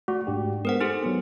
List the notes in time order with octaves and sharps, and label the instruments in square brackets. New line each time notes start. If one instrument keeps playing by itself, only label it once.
[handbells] A3 [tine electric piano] F#4
[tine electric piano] G#2 D4 G4
[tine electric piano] G#3 B3 [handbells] A#4 C5 F#5
[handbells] D#4 G4 A4 [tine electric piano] F6
[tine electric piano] F#3 B3